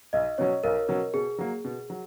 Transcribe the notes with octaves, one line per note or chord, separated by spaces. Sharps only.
B1 D#5
B2 F#3 C#4 C#5
B1 A#4
B2 F#3 C#4
B2 G#4
F#3 A#3
B2
F#3